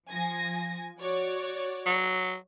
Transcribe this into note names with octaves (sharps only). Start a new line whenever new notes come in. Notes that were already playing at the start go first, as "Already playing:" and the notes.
F3 G#5 A#6
F#4 C#5 D5
F#3